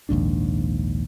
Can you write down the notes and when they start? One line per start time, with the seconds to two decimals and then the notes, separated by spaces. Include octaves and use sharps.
0.09 A#1 D#2 G#2 D4